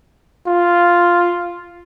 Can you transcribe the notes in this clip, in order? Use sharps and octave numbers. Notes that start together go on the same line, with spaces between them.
F4